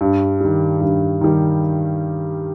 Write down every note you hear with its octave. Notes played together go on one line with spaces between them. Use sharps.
G2
D#3 G3
G2
D#3 G3